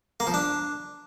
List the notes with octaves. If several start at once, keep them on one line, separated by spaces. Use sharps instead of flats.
A#3
F3
D4